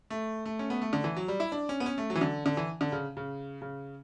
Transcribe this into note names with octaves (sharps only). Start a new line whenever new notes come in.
A3
A3
C#4
B3
A3
D3
E3
F#3
G3
E4
D4
C#4
B3
C#4
A3
F#3
E3
D3
D3
E3
D3
C#3
C#3
C#3